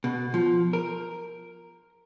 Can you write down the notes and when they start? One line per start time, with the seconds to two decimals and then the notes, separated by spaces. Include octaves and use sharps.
0.04 B2
0.34 F3
0.73 A#4